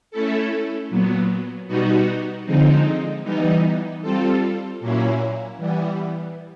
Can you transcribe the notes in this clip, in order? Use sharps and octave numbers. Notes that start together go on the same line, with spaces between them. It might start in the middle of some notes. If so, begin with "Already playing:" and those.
A3 C#4 E4 A4
A#2 F#3 B3
B2 G3 B3 D#4 F#4
D3 F3 G#3 C4 D#4
E3 G3 B3 D#4
G3 C4 F4 A4
A#2 F#3 A#3 C#4 E4
E3 G3 B3